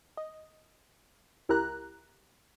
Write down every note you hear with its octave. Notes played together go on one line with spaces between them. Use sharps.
D#5
C#2 E4 G4 A#4 A#5 F#6